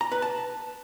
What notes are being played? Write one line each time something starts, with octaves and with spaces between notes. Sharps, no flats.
A#5
B4
A5